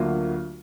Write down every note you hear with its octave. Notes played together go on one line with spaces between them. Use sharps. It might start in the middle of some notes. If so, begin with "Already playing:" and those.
Already playing: D2 D3 F#3 A#3 F4